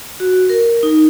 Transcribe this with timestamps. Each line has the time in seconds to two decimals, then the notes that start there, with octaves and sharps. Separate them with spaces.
0.20 F#4
0.50 A#4
0.83 D#4